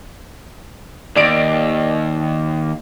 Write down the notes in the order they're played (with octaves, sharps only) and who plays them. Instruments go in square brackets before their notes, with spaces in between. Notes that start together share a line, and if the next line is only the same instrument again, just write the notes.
[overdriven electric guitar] D#2 [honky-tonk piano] D5 D7